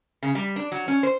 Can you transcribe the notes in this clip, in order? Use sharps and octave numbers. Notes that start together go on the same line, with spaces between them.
C#3
G3
D4
F#3
C#4
C5